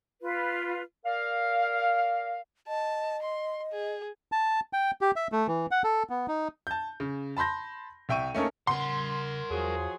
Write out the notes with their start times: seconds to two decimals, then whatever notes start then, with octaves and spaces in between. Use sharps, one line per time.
0.22 F4 B4
1.05 A#4 D5 F5
2.68 D#5 A5
3.22 C6
3.71 G#4
4.32 A5
4.73 G5
5.01 G4
5.16 E5
5.32 A3
5.47 E3
5.71 F#5
5.84 A4
6.10 B3
6.28 D#4
6.67 A5 G6
7.00 C#3
7.37 A5 B5 C6 G6 A#6
8.09 C2 E5 G5 C#6 D#7
8.34 A3 A#3 C#4 D#4 A4 A#4
8.67 C#3 A#4 F#5 C6
9.50 E2 F3 F#3 G#4